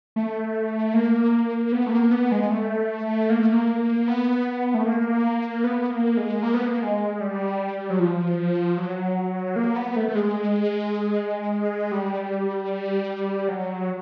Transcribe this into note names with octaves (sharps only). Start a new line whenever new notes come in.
A3
A#3
B3
A3
A#3
B3
G#3
A3
A#3
A3
A#3
B3
A3
A#3
B3
A#3
G#3
A#3
B3
A#3
G#3
G3
F#3
F3
F#3
A#3
B3
A3
A3
G#3
G3
F#3